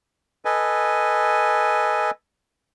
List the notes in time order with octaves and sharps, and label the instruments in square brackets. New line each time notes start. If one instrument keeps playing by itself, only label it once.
[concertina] A4 B4 D#5 G#5